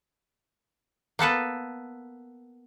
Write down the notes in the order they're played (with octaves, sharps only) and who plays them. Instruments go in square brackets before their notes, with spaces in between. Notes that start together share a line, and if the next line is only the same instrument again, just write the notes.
[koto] A#3 B3 A4 B4